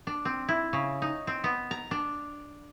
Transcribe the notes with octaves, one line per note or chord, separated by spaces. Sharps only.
D4
C4
E4
C#3
D#4
C4
B3
A#5
D4